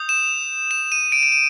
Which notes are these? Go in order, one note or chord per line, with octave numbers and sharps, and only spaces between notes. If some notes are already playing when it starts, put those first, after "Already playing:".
Already playing: D#6 G6
E7
E7
D#7
D7
D7
D#7